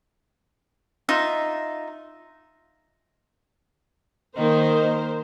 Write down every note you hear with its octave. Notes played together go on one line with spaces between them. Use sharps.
D#4 F4 E5
D#3 A#3 A#4 C5 D#5